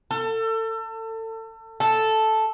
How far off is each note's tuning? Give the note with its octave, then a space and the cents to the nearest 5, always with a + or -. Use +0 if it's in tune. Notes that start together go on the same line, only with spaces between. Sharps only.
A4 +30
A4 -5